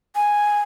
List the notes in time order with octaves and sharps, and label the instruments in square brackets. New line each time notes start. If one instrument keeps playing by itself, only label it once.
[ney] G#5